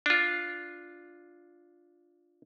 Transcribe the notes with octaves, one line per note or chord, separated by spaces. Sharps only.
D4 F4